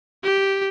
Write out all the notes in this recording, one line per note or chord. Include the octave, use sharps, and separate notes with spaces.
G4